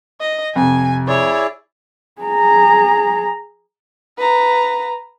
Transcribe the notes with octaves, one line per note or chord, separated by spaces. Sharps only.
D#5
F2 C3 G#5
E4 G#4 C#5 D5
G#4 A#5
B4 A#5